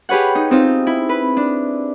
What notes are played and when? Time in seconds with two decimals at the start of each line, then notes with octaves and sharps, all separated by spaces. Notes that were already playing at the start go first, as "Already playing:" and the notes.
0.09 G4 G#4 B4 C#5 F#5
0.35 D#4
0.51 C4 D#4 F4
0.87 E4
1.09 B4
1.37 D4